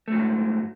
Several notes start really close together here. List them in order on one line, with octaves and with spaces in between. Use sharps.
A3 F#3 G#2